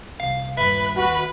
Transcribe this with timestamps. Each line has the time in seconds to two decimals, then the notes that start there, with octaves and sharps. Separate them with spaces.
0.20 C2 F5
0.57 D#1 G2 B4 E5
0.97 D#2 F#4 B4